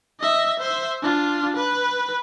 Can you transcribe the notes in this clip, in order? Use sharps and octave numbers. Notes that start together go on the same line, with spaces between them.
D#5 E5
C5 E5
D4 F4
B4